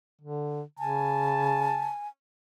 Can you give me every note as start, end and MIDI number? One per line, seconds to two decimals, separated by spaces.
0.21 0.62 50
0.79 1.93 49
0.79 2.08 80
0.79 1.92 81